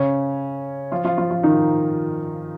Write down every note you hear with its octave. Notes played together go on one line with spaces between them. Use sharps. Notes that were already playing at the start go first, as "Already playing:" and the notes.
Already playing: C#3 C#4
F3 F4
F3 F4
F3 F4
F3 F4
D#3 D#4